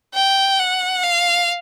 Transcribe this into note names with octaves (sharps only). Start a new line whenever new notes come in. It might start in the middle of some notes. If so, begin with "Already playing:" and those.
G5
F#5
F5